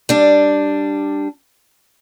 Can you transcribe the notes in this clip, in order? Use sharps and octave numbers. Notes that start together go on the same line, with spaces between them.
G3 D4